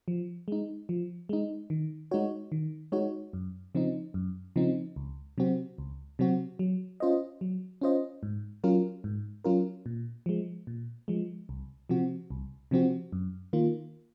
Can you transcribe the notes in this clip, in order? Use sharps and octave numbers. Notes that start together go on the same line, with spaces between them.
F3
G#3 D#4
F3
G#3 D#4
D#3
G#3 D#4 F#4 C#5
D#3
G#3 D#4 F#4 C#5
F#2
C#3 F3 C4 D#4
F#2
C#3 F3 C4 D#4
C#2
C3 F#3 C4 F#4
C#2
C3 F#3 C4 F#4
F#3
C#4 F4 C5 D#5
F#3
C#4 F4 C5 D#5
G#2
F#3 C#4 F4 A#4
G#2
F#3 C#4 F4 A#4
A#2
F3 G#3
A#2
F3 G#3
C2
C3 F3 C4 F#4
C2
C3 F3 C4 F#4
F#2
D#3 A#3 F4